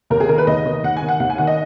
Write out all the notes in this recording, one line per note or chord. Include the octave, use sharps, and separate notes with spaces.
D#2 A#4
G#4
D#3 A#4
B4
D#2 D#5
D#3
D#2 F#5
G#5
D#3
F#5
D#2 F#5
G#5
D#3 F#5
D#5